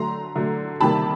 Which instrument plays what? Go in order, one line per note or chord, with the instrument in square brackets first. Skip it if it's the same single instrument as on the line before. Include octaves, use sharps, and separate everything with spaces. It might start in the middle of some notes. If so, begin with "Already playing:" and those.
Already playing: [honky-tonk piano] D3 F#3 A3 A#5 C6
D3 F#3 A3
C3 D#3 G3 A#3 A5 B5